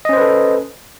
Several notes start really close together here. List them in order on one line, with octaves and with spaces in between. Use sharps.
D#5 C#4 C5 B4 A4